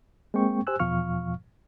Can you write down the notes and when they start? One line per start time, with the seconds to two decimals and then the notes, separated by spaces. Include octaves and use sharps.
0.34 G#3 A#3 C4 G5 C#6
0.67 G4 C5 G#5 E6 F#6
0.79 E2 B2 F3 F5 C#6 F6